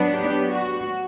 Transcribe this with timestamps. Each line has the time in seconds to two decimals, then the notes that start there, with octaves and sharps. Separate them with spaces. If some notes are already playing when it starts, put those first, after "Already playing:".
Already playing: F#3 B3 D4
0.13 G4
0.53 F#4